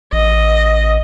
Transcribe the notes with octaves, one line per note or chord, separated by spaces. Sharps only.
A1 D#5